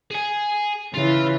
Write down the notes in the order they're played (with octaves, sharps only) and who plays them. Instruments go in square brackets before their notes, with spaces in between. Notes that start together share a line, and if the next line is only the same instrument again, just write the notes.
[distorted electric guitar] G#4 G#5
[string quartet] C#3 E3 [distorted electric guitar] F4